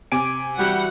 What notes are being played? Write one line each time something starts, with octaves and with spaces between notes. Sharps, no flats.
C3 G#5 D6 D7
E3 G3 F#4 F#5